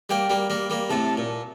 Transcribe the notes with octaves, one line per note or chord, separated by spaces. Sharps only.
G3 A#3 G5
G3 A#3
G3 A#3
G3 A#3
A2 C3 A5
A#2